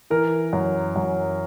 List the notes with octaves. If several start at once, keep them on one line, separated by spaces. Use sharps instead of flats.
E3 A#4
F#2
F#2